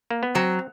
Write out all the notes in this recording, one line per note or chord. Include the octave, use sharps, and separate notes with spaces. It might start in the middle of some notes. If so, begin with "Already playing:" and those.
A#3
B3
F#3 C4